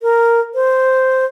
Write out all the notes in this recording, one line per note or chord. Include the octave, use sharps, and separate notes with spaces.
A#4
C5